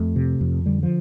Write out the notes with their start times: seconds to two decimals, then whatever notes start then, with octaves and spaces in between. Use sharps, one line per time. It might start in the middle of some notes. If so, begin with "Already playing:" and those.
Already playing: F2 A3
0.16 C3
0.41 F2
0.66 D3 G3
0.83 F3